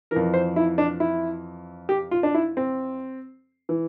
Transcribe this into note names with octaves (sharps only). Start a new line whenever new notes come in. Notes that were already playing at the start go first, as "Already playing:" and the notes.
F2 E3 A#4
C5
E4
D4
E4
G4
F4
D4
E4
C4
E3